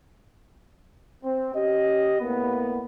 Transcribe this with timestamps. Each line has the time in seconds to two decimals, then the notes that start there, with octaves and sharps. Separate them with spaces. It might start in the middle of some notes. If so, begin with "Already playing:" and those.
1.24 C4
1.54 C#4 G4 D#5
2.19 A2 A#3 B3